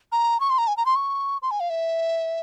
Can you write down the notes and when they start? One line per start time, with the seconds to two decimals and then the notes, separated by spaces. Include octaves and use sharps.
0.12 A#5
0.40 C#6
0.50 C6
0.58 A#5
0.67 G#5
0.77 A#5
0.86 C6
0.96 C#6
1.42 C6
1.51 G#5
1.60 F5
1.70 E5